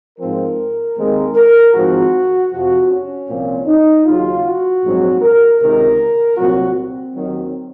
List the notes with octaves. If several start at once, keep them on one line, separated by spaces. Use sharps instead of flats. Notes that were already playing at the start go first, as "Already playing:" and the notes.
G#2 F3 C4 A#4
D#2 D#3 G#3 C4
A#4
G#1 G#2 F3 C4 F#4
F2 C3 F3 F#4
C#4
C2 A#2 F3 C4
D#4
D#2 C#3 F#3 F4
F#4
A#1 G#2 F#3 C4
A#4
C#2 C3 D#3 A#4
C2 A#2 F#3 C4 F#4
C4
D#2 D#3 F#3